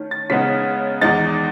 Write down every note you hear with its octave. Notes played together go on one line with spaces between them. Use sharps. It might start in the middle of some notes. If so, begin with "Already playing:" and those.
Already playing: D#3 A3 C#4
A6
C#3 G#3 B3 D#4 B6
E2 D#3 G#3 D#4 A6